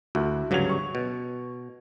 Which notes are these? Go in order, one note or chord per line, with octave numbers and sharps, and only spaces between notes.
D2 E4 F#4
D2 G2 C#3 F#3 G#6 F7
C#6
B2